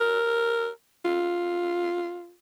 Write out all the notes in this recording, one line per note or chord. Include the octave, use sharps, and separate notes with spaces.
A#4
F4